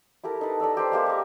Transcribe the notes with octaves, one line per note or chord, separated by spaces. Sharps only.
E4 G4 A4 A#4
D#4 A4 B4
A4 D5 A#5 E6
G4 B4 C5
G#3 A#3 G4 E5
A#5 C#6